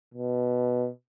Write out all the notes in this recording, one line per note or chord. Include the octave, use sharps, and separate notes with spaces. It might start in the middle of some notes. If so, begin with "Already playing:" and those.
B2